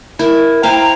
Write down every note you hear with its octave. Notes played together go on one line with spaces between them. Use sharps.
E4 A#4
E4 C5 F5 G5 A#5